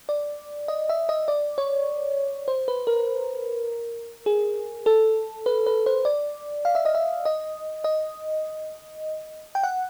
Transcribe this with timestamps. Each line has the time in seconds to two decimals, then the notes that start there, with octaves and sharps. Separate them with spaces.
0.09 D5
0.68 D#5
0.89 E5
1.09 D#5
1.28 D5
1.58 C#5
2.48 C5
2.68 B4
2.87 A#4
4.26 G#4
4.86 A4
5.46 B4
5.66 B4
5.86 C5
6.05 D5
6.65 F5
6.75 E5
6.85 D#5
6.95 E5
7.25 D#5
7.84 D#5
9.55 G5
9.63 F#5